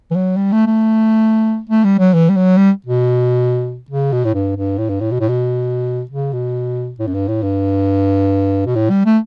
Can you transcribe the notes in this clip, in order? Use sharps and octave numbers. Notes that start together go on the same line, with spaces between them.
E3
F#3
G3
A3
A3
A3
G3
F#3
E3
G3
F#3
G3
B2
C#3
B2
A2
G2
G2
A2
G2
A2
B2
A2
B2
C#3
B2
A2
F#2
G2
A2
G2
B2
A2
G3
A3